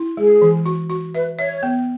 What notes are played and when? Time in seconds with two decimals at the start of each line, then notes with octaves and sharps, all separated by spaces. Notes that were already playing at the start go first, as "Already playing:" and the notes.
Already playing: E4
0.17 G#3 G#4
0.42 E3
0.66 F#4
0.90 F#4
1.15 B4 E5
1.38 C#5 E5
1.63 B3